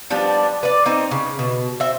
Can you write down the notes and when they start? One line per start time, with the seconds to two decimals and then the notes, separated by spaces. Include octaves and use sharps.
0.10 F3 G3 B3 D4
0.63 B4 D5
0.86 C4 D#4
1.11 C#3
1.39 B2
1.80 C4 E5